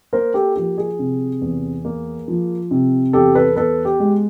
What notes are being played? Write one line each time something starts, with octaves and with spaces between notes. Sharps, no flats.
A#3 A#4 C5
G4 A4
F3 G4
G#4
C3
E2
A#3
F3
C3
E2 G4 A4
A4 B4
B3 A4 B4
G4
G#3